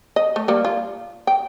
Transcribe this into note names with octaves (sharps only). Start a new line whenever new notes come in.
D#5
A3
G3 A#3
F4
G5